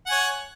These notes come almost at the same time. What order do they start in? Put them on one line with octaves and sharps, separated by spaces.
F#5 G#5 C#5